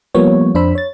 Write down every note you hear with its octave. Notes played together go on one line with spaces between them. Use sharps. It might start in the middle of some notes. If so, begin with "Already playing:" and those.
F3 G3 A#3 B3 C#5
F2 D4 C5 B5 E6
C#5 A6